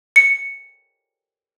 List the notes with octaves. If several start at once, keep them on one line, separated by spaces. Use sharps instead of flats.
C#7